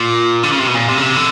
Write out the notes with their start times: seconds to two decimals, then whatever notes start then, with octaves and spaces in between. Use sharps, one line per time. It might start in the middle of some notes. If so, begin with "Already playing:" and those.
Already playing: A#2
0.43 D3
0.51 C#3
0.59 C3
0.67 B2
0.74 A#2
0.88 C3
0.98 C#3
1.02 C3
1.16 D3